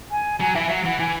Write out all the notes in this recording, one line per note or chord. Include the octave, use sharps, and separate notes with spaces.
G#5
F#3 G#5
E3 E5
F#3 F#5
E3 F#5
E3 G#5